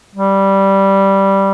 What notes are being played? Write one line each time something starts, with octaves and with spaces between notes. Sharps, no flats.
G3